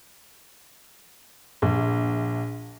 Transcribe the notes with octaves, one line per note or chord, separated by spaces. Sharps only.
A#1